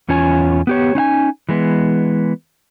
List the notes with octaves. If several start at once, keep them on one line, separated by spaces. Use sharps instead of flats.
E2 C#4 F4 C#5 G#5
B3 G4 C#5
C#4 D#4 F5 G#5
E3 G#3 B3